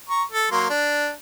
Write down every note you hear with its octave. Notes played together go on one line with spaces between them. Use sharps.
A#5 C#6
A4
F#3 A#3 C6
D4